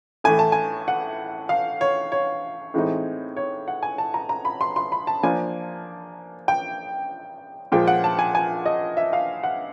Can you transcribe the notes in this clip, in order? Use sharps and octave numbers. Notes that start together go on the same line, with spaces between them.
A2 E3 A3 G#5
A5
G#5
F#5
F5
C#5
C#5
A2 E3 G#3 C4 D#4
C#5
F#5
G#5
A5
A#5
A#5
B5
C6
C6
B5
A5
F3 A#3 D4 G#5
G5
A#2 F3 G#3 G5
F#5
A5
G#5
G#5
D#5
E5
F5
F#5